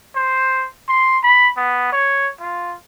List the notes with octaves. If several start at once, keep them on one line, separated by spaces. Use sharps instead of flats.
C5
C6
B5
B3
C#5
F4